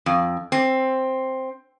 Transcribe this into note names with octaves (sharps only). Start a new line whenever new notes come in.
F2
C4